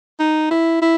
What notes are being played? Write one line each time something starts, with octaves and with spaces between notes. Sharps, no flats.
D#4
E4
E4